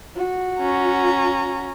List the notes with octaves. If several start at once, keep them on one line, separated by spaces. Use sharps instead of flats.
F#4
C#4 A#5